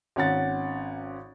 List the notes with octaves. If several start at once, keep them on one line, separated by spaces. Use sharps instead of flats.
G#1 C#4 F#5 A6